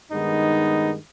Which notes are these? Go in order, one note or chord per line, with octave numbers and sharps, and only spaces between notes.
G2 D#3 G#3 B3 D#4